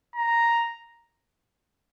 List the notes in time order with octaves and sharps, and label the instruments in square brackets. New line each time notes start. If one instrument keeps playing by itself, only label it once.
[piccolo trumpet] A#5